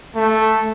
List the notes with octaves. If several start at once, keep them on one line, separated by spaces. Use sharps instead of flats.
A3